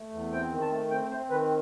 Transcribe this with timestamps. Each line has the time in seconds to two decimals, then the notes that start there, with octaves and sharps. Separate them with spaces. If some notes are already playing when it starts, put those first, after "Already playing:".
Already playing: A3
0.12 E2
0.31 C4 G5
0.51 D#3
0.61 A5
0.71 A3
0.91 C4 G5
1.10 C4 C5
1.30 D#3 B4